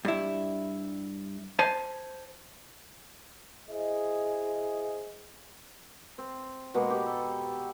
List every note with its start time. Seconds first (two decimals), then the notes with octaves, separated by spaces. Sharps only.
0.05 G2 E4
1.59 C5 G#5 A5
3.69 E4 G#4 C5 D#5
6.18 C4
6.74 B2 G#3 A#3
6.90 G4 B4
7.06 A4